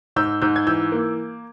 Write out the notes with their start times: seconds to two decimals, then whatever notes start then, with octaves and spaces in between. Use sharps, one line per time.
0.16 G#2 E6 G6
0.42 G#2 E6 G6
0.56 G#6
0.67 E3 E6 G6
0.92 A#3